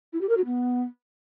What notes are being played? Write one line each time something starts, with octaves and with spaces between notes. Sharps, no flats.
E4
G4
A#4
F#4
B3